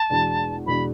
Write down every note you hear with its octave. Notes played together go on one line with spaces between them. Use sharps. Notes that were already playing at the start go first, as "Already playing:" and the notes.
Already playing: A5
E2 B2 G#3 D4
E2 B2 G#3 D4 B5